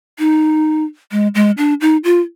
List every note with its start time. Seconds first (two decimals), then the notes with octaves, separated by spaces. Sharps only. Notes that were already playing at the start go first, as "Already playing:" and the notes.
0.19 D#4
1.11 G#3
1.35 G#3
1.58 D4
1.81 D#4
2.04 F4